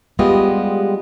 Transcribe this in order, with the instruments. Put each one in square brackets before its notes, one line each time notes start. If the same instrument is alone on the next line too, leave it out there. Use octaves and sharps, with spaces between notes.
[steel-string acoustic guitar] G3 G#3 B3 F4 G4 D#5